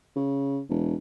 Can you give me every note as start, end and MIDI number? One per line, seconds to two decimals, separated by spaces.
0.16 0.60 49
0.69 0.95 28